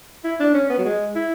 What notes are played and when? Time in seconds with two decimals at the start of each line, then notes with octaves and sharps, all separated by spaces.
0.24 E4
0.40 D4
0.54 C#4
0.70 B3
0.78 F#3
0.85 G#3
1.15 E4